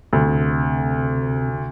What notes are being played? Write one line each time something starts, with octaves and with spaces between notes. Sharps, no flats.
D2 C3